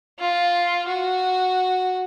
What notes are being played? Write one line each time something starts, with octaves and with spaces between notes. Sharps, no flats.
F4
F#4